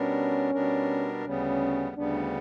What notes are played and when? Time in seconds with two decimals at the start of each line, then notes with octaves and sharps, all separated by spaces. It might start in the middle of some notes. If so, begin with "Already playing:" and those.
Already playing: B2 G3 B3 C#4 D4 A#4
0.55 B2 G3 B3 D4 A#4
1.25 D2 C#3 G3 B3 C#4
1.96 D2 C#3 G3 B3 D4